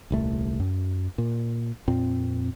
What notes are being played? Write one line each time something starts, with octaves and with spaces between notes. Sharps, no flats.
D#1 C2 A3
F#2
A#2
F2 A#2 C4